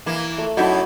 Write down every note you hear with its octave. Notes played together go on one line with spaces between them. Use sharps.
E3 A#3
A3
F#2 D#4 E4 F#4 A5 B5